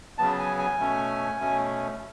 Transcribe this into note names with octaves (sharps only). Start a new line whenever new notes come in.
C#3 F#3 B3 A5
G#5
G#5
B2 A3 C#4
B2 A3 C#4